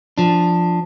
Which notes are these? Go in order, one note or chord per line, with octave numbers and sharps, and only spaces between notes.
F3 D4